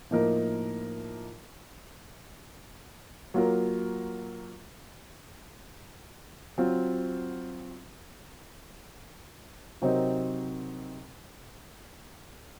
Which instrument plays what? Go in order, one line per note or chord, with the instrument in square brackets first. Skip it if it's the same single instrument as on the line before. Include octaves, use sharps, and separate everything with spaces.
[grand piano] A2 F3 A#3 D#4 A#4
F#3 A#3 F4 A#4
F#3 C4 F4
C3 F#3 C4 D#4 A#4